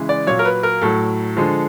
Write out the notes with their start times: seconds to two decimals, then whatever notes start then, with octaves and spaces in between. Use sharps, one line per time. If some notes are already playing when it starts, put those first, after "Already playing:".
Already playing: C#3 E3 G#3
0.09 D5
0.27 A#2 F#3 C#5
0.39 A#4
0.45 B4
0.63 A#4
0.82 A2 F#3 A4
1.37 D3 F3 G#3